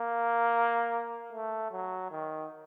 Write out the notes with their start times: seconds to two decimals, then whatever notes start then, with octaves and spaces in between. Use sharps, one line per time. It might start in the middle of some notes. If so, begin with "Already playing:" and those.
Already playing: A#3
1.33 A3
1.72 F#3
2.11 D#3